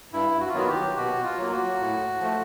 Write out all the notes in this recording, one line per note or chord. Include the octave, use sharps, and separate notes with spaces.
G2 E4
F#4
F4
D#3 F#3 B3 F#4
G4
B2 F#4
F4
F#3 A#3
F#4
A2
F3 A3